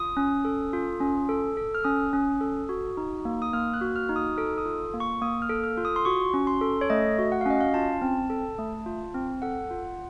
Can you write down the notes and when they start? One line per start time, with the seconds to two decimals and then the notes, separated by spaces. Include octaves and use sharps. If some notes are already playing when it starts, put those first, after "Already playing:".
Already playing: F4 D#6
0.17 C#4
0.45 A4
0.73 F4
1.00 C#4
1.29 A4
1.57 A4
1.75 F6
1.84 C#4 D#6
2.13 C#4
2.41 A4
2.69 F#4
2.97 D#4
3.25 A#3
3.42 D#6
3.53 A#3 F6
3.74 F#6
3.81 F#4
3.96 F6
4.09 D#4
4.16 D#6
4.37 A4 F6
4.58 D#6
4.66 F4
4.94 A#3
5.00 C#6
5.21 A#3 D#6
5.42 F6
5.49 A4
5.64 F6
5.77 F4
5.85 D#6
5.96 C6
6.05 F#4 C#6
6.34 C#4
6.47 C6
6.61 A4
6.81 C#5
6.90 A3 D#5
7.18 F#4
7.32 F#5
7.41 F5
7.46 C#4 D#5
7.61 F5
7.74 F4 A5
8.02 C4
8.30 A4
8.59 A3
8.86 F4
9.14 C4
9.42 A4 F#5
9.71 F4